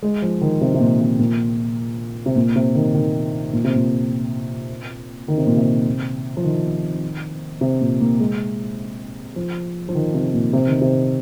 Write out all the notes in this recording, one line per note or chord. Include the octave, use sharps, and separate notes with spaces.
G#3
F3
D#3
C3
C3
A#2
C3
A#2
C3
A#2
C3
D#3
D#3
A#2
C3
A#2
D#3
C3
A#2
C3
F3
D#3
C3
A#2
A#3
G#3
F3
F3
D#3
C3
A#2
C3
D#3
C3